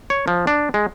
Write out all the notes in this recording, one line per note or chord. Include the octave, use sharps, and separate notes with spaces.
C#5
F3
D4
G#3